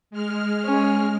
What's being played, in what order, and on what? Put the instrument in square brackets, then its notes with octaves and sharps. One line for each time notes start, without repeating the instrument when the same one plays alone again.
[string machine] G#3 F6
[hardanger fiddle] C#4